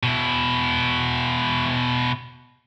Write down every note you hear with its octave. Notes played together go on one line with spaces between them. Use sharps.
B2 E4